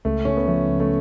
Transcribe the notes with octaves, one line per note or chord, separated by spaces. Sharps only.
C#2 A3
C#3 C#4
B3
F3 A3
C#2
A3